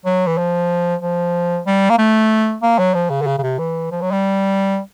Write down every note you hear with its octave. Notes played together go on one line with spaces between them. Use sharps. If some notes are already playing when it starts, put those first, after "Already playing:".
F#3
E3
F3
F3
G3
A#3
A3
A#3
F#3
F3
C#3
D3
C#3
C#3
C3
E3
F3
F#3
G3